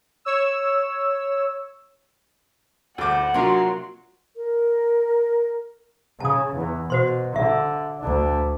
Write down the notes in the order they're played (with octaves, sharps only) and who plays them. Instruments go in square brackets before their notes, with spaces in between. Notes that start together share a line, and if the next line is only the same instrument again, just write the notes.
[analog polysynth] C#5 E6
[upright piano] D2 D6 [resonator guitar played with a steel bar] A2 G3 C5 [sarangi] F#5
[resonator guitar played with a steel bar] C3 D4 A#5 [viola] F#3 C6 [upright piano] A#3 F4
[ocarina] A#4
[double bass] C#3 [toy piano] A5 D#6
[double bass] E2
[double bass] B2 [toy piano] F#4 C5 C6
[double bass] D3 [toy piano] E5
[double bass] D2 D4